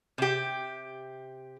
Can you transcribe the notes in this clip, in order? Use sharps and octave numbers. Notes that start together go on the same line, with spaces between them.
C3 G4